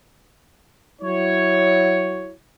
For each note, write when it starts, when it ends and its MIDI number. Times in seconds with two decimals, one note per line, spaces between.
1.02 2.33 54
1.02 2.33 64
1.02 2.33 66
1.02 2.33 73